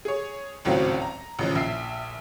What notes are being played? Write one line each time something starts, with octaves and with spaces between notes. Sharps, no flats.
G#4 C#5
G#1 C#2 A2 F#3 C4
A#5
A1 C#3 F3
A#1 E5 C7